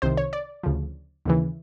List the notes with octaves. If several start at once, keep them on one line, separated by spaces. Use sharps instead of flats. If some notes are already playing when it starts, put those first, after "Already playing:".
C2 C3 D#3 C5
C#5
D5
D2 C#3 F3
D#2 C#3 E3